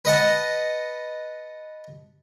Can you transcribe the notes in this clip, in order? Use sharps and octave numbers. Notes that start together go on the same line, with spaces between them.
B4 D#5 F#5 A5